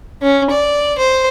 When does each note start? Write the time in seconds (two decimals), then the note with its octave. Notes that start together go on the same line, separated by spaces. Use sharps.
0.22 C#4
0.51 D5
0.99 C5